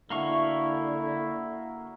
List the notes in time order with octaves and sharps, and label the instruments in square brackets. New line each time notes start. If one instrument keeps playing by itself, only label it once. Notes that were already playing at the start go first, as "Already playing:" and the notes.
[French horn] D3 [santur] A3 F#4 E5 [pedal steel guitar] A#3 F5 C#6 [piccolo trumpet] E4